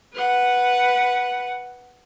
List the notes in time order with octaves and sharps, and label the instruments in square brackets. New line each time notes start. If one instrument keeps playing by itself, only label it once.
[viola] B4 F#5